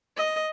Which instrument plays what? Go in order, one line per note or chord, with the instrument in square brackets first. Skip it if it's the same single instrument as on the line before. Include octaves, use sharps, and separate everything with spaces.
[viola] D#5